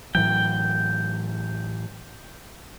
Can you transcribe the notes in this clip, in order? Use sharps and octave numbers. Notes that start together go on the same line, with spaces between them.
A2 E3 F#3 G5